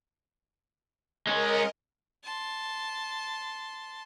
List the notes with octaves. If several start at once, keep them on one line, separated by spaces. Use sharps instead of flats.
G#3 C#4 A#4 D#5
A5 C6